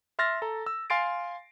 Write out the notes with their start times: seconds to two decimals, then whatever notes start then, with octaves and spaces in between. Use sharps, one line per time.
0.19 E5 C6 F6 A6 A#6
0.42 A4 A#5
0.66 E6
0.90 F5 G#5 C6 A6 C7 D7